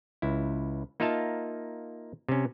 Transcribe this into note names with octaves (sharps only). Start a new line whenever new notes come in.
C#2 E4
A#3 D#4 F4 E5 F5 A5
C3 C#4